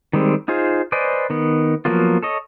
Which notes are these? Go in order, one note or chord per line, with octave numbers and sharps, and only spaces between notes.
D#3 G3 G#3 C4
D#4 F4 G#4 C5
B4 C5 D5 D#5 G#5
D#3 B3
F3 F#3 A#3 B3 F4
A4 C#5 D#5